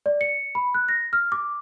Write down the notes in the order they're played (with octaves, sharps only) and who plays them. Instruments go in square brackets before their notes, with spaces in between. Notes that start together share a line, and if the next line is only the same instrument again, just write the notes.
[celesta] D5
C#7
B5
F#6
A#6
F6
D6